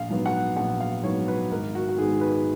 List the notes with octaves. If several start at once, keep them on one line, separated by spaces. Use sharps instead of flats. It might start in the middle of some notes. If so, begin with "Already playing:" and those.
Already playing: A#1 F5
G#2 F#3 B3
F#5
A#1 F#5
F5
G#2 F#3 B3 C#5
B4
G#1 A#4
F#4
F#4
G#2 D#3 G#3 B3 G#4
B4